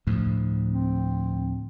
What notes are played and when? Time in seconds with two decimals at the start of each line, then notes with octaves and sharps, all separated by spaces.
0.07 D2 A2 F3
0.70 C4